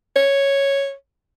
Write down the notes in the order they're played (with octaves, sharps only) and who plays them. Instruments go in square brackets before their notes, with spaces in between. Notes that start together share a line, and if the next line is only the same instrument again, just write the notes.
[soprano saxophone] C#5